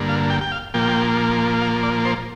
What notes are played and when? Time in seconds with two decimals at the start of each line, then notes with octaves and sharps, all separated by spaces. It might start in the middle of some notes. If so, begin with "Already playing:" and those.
Already playing: G2 D3 A#3
0.09 F5
0.30 G5
0.41 G5
0.52 F5
0.74 A#2 F3 A#3 G5
1.61 F5
1.83 D5
2.05 C5